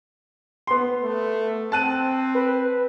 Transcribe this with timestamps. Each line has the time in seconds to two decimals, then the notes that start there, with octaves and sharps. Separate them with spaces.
0.67 B3 C6
1.02 A3
1.72 C4 A5 F#6 D#7
2.35 B4